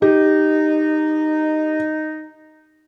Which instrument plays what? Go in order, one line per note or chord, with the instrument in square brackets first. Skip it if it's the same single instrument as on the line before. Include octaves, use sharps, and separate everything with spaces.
[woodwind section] D#4 [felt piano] G4